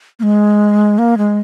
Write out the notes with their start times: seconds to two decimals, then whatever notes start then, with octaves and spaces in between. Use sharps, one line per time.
0.20 A#3
0.23 G#3
0.98 A#3
1.18 G#3